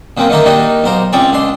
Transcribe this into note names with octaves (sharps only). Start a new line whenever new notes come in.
C#3 F#3 A#3 C4
D3 D#3 A3 A4 A#4
G3 A#3 D4 D#4 F#4
B1 A#4 C5
C#2 C#3 C4 C#5 D5
C#2 D4 C6